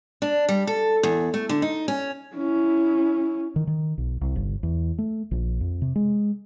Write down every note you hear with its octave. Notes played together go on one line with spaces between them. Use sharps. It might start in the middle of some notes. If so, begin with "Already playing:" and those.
D4
G3
A4
E2
A3
D3
D#4
C#4
C#4 E4
D#3
D#3
B1
C2
G1
E2
A3
A#1
F2
C3
G#3